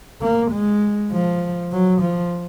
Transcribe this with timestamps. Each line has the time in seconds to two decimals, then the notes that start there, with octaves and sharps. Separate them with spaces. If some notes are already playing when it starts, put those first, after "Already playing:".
0.21 A#3
0.52 G#3
1.12 F3
1.72 F#3
2.01 F3